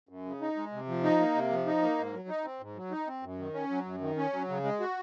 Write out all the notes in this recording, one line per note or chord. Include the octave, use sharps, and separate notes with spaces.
F#2
C#3
D#4
G#3
C3
F3
D#4
A#3
C3
F3
D#4
A#3
G#2
F#3
D#4
C4
G#2
F#3
D#4
C4
F#2
D#3
C#4
F#3
F#2
D#3
C#4
F#3
C#3
G#3
F#4